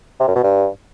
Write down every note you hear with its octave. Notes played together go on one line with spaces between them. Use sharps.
C3
F#2
B2
G2